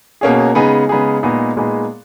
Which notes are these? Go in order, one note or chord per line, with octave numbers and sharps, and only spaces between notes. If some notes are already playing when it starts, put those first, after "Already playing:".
B2 A#3 C#4 G#4
C#3 G#3 B3 D#4 G#4
C#3 G#3 B3 D#4 G#4
A#2 G#3 B3 D#4 G#4
A#2 G#3 B3 D#4 G#4